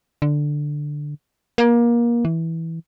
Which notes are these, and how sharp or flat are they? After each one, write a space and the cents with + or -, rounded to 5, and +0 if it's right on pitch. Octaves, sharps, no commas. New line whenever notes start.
D3 +5
A#3 +25
E3 -10